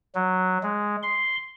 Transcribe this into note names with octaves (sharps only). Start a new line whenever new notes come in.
F#3
G#3
C6